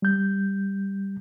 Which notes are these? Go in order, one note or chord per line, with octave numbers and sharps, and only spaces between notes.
G3 G6